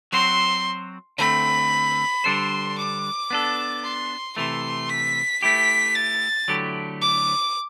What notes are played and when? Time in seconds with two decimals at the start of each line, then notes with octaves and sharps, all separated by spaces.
0.12 F#3 C4 F#4 C5 C6
1.18 D3 A3 C4 B5
2.24 D3 G3 D4 A4 C5 C6
2.77 D6
3.30 B3 D4 A4
3.83 C6
4.37 C3 E3 A3 C6
4.89 B6
5.42 A3 E4 G4 B6
5.96 A6
6.48 D3 F#3 A3 E4 G4
7.01 D6